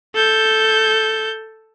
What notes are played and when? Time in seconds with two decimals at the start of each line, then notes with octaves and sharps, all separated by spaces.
0.15 A4 G6